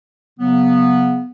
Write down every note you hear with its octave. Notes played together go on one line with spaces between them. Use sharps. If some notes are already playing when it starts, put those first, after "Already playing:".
C#3 F#3 B3